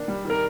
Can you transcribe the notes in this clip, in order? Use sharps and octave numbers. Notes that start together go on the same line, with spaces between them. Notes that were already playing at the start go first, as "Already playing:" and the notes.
Already playing: D#3 A#3 D4
G3
D#3 A#4